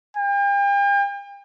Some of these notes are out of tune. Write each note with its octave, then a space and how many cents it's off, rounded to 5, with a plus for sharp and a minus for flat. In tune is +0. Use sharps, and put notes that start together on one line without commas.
G5 +40